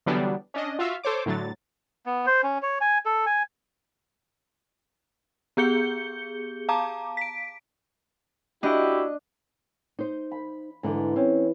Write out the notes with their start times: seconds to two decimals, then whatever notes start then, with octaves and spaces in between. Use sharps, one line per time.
0.06 D3 E3 F#3 G3 B3 D4
0.54 C#4 D4 D#5
0.79 F4 F#4 E5 F5
1.03 A4 C5 C#5 D6
1.26 A2 D3 F#3 A6
2.06 B3
2.26 C5
2.43 C#4
2.62 C#5
2.81 G#5
3.06 A4
3.26 G#5
5.57 B3 G4 G#4 G6 C#7 G7
6.69 F5 A5 A#5 D6
7.17 B6 D7
8.63 D4 E4 F#4 G4 D#5
9.99 D#4 C5
10.31 B5
10.83 G#2 D3 E3
11.16 C4 C#4